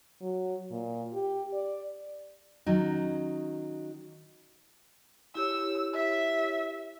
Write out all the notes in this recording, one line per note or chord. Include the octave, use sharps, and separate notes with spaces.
F#3
A#2
G4
D5
D#3 F#3 C#4 D#4
E4 G4 C#5 E6
E5